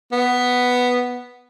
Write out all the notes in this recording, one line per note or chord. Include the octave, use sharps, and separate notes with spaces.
B3